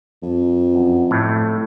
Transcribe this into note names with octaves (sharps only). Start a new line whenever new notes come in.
F2
F#2
A2 A3